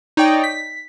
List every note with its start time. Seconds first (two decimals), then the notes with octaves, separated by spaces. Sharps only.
0.17 D#4 C#5 D5 G5
0.44 B6